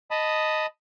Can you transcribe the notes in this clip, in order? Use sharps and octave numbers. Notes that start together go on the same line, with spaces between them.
D#5 A5 B5 D#6